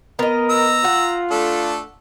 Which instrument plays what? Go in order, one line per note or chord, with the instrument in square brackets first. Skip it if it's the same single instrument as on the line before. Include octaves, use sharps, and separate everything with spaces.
[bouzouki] B3 D#5 [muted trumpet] A#4
[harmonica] A#5 E6
[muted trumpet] F4 [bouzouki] F#5
[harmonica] A3 D4 A4